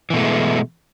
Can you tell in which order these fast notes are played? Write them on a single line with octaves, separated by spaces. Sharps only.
E3 B2 A3 G#3